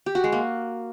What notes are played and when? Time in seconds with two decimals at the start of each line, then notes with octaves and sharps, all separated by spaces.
0.06 G4
0.15 F#4
0.24 G#3
0.32 A#3